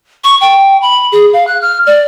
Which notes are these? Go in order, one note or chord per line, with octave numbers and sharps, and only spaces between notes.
C#6
G5
B5
G#4
F5
F#6
F6
D5